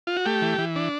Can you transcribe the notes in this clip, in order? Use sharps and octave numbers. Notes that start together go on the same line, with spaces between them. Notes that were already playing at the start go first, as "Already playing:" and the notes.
F4
F#4
A3 G4
E3
E3
D4